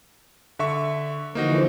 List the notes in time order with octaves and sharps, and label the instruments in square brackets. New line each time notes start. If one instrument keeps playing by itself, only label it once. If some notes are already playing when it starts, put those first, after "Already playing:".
[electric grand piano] D3 E5 C#6
[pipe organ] D3 E3 F3 [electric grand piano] A#3 D#4 F#4